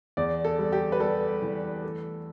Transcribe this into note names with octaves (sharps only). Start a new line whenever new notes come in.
E2 D5
A4
G3
G4
B4
G3 A4
E3
A3